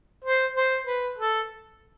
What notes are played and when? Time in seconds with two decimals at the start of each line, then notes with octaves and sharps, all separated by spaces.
0.24 C5
0.56 C5
0.87 B4
1.18 A4